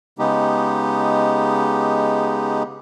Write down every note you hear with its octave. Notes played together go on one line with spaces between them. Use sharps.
C#3 G#3 B3 D#4 G4